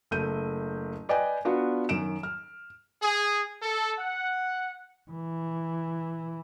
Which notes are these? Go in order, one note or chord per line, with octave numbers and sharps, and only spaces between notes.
F#1 A3 G6 D#7
B4 D5 D#5 G5 G#5
B3 D4 F4 F#4
F#2 D#3 D7 E7
F6
G#4
A4
F#5
E3